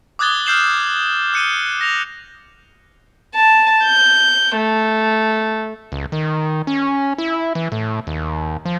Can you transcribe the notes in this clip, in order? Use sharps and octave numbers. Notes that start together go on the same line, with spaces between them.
D6 D#6 F#6 G#6 A6 G7
F6 G6 C7 E7 F#7
F#6 C#7 D#7 G7
A#6 F7
A5
G6
A3
C#2
D#3
C#4
E4
E3
A2
D#2
F3